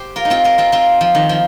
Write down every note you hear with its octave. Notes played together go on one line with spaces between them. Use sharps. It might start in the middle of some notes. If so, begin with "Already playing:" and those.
Already playing: G4 C5
F4 A#4
D#4
C4 F4
F4 A#4
C4 F4
C4 F4
F3
D#3
F3